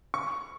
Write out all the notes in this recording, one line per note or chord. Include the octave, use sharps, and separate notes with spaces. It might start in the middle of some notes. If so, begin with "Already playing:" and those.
C#6